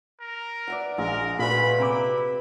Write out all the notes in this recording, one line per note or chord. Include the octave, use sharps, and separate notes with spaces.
A#4
D5 E5 F#5
A#1 G#3 A#4
A#2 A3 F#4 B4 B5
C3 E4 B4 G5 A#5 D6